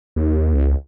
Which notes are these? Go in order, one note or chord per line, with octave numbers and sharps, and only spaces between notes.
D#2
C#2